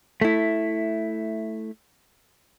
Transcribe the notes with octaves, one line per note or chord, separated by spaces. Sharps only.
A3 E4